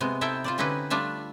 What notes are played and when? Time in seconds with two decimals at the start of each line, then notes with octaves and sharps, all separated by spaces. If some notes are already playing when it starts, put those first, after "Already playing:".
0.01 C3 G#3 B3
0.21 D#4 E4 A4 E5 G5
0.44 F4 C5 D5
0.58 D3 C#4 D#4 E4 G4 B4
0.90 G3 A3 D4 F4 E5